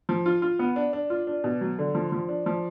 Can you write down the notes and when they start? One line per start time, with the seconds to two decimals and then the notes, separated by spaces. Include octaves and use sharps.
0.09 F3
0.26 F4
0.42 F4
0.59 B3
0.76 D4
0.93 D4
1.10 F4
1.27 D4
1.44 B2
1.61 F#3
1.79 D3
1.95 F3
2.12 F3
2.29 D4
2.46 F3